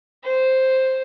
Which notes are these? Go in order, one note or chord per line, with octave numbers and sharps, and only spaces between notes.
C5